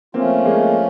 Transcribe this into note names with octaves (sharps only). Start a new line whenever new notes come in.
F3 A3 A#3 C4 C#4 F4
G#3 A#3